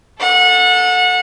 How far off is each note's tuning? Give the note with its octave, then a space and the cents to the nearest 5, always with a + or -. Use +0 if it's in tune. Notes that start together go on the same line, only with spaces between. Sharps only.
A4 +0 F#5 -30